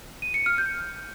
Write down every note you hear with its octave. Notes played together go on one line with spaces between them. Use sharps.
D#7
C#7
F6
G6